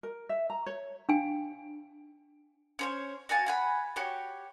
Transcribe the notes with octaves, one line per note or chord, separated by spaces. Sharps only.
A#4
E5
A#5
C#5
D4 F5 G5 G#5
C#4 C5 C#5
F#4 F5 G#5 A5
F#5 G#5 B5
F#4 G4 C#5 C#6